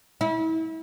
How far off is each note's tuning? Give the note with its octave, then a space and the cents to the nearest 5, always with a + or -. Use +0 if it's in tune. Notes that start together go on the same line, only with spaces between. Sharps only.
E4 -35